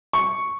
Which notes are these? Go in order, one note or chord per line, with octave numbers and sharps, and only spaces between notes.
C#6